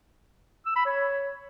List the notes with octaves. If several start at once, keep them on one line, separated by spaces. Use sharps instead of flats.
E6
B5
C#5